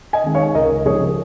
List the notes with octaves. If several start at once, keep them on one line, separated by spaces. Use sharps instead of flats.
D#5 G#5
D#3 G#3
C#5 F5
C#2 A#4 D#5
C#3 F3 G#3 G#4 C#5